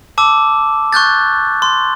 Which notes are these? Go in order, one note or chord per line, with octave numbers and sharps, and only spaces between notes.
A5 D6 E6
C#6 F#6 G6 A6
C6